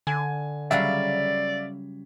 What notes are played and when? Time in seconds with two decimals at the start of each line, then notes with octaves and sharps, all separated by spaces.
0.07 D3 G#5 G#6
0.71 C#3 F#3 G3 D5 E5 F5